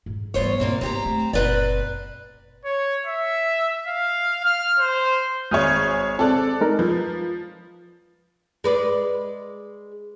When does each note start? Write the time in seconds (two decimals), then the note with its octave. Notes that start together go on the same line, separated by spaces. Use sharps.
0.06 G#2
0.34 E2 D3 G3 C5 C#5
0.60 G2 A#2 C#3 A#3 C4
0.81 B3 C4 G4 A#5
1.05 A3
1.33 F#1 A#2 C4 B4 D5
2.65 C#5
3.06 E5
3.88 F5
4.44 F6
4.79 C5
5.51 G#1 G#4 C#5 D#6 F6 G6
6.19 C4 A4 D5 F#6
6.61 G#3 D#4 A#4
6.79 F3 B4
8.64 G#3 B4 D5